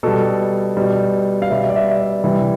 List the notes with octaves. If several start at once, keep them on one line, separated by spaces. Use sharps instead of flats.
B2 G3 A4
B2 G3
F5
B2 G3 E5
D5
E5
D5
C3 E3 G3 E4